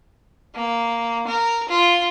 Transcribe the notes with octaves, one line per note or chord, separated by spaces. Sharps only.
A#3
A#4
F4